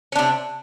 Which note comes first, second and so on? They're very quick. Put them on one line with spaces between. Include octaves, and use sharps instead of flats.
C#4 D4 C3